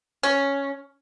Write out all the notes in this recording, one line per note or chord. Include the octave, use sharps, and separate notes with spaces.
C#4